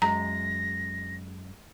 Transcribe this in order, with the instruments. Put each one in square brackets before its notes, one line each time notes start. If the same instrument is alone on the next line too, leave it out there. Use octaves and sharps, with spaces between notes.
[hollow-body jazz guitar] F#2 G#3 [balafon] A#5 [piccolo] A#6